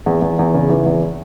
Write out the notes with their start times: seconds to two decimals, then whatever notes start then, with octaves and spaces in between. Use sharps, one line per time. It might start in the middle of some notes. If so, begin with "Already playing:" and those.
0.06 E2
0.22 E2
0.39 E2
0.54 C#3
0.70 E3
0.86 E2